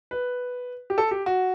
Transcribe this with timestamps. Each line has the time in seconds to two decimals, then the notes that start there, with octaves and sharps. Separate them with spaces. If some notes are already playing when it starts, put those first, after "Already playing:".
0.11 B4
0.90 G4
0.98 A4
1.11 G4
1.26 F#4